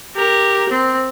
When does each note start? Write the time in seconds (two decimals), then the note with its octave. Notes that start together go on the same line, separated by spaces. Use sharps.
0.15 G4 A#4
0.69 C4